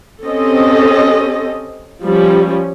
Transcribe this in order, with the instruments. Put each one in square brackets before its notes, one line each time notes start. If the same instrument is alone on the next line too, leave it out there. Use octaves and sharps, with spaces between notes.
[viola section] C4 C#4 G4 A4 D#5
F3 G3 C#4